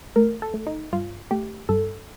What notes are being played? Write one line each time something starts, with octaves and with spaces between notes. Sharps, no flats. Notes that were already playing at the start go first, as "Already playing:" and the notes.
A3 A#4
A4
A3
D#4
G2 F4
A3 G4
G2 A4